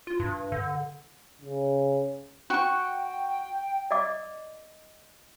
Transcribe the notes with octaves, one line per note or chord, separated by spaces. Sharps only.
F4
G2
D3
C#3
F#4 G5 C#6
D5 D#5 D6